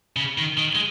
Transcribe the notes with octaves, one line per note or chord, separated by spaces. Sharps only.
C#3
D#3
D#3
G#3